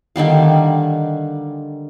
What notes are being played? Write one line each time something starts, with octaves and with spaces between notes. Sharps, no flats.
D3 D#3 G3 F5